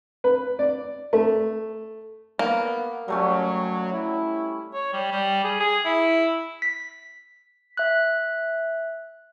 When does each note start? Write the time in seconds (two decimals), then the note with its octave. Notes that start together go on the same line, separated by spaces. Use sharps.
0.24 B4
0.59 D5
1.13 A3
2.39 A#3 B3
3.08 F#3 G3 A3 C#4
3.93 E4
4.74 C#5
4.93 G3
5.11 G3
5.44 G#4
5.60 G#4
5.85 E4
6.62 B6
7.77 E5 F#6